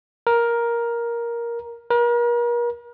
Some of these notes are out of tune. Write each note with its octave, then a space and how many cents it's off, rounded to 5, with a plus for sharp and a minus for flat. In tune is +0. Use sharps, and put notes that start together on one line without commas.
A#4 +10
A#4 +40